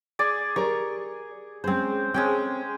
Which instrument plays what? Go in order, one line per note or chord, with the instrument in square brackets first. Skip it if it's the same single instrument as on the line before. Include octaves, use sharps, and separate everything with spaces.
[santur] G#4 D5
[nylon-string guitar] G4 A#4 D5 [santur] C#6
[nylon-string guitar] G#3 C#4 G#4 [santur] C4 C5
[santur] G#3 C#4 G5 [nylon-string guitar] C4 G#4 A4